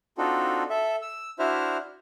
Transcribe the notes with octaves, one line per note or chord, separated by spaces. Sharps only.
C4 D4 D#4 F4 F#4 A4
A4 E5
E6
D4 E4 F#4 C5 E5 F6